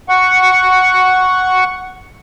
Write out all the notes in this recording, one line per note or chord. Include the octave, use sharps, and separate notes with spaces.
F#5 C#6